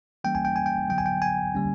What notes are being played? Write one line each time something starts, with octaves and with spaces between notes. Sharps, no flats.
E3 G3 A#3 C#4 G5
G#5
G5
G#5
G5
D3 F#3 B3 G5
G#5
G5
G#5
D3 G3 A#3 C#4